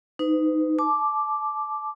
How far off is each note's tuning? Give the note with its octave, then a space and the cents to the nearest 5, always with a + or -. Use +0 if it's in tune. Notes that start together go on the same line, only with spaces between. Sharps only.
D#4 +0 B4 +45
A5 -30 D6 +0